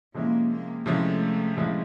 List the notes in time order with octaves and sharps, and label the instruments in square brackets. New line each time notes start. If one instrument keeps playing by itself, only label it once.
[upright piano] C3 F3 G#3 C#4 E4 [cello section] A#3
[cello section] A#3
[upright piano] C3 F3 G#3 C#4 E4 [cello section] A3
[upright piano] C3 F3 G#3 C#4 E4